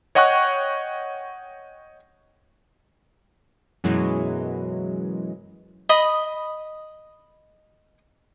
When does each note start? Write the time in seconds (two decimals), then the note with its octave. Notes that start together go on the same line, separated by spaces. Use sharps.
0.15 C#5 D#5 F#5 G5 C#6 F#6
3.84 F#2 B2 E3 F#3 G#3
5.89 D#5 B5 D#6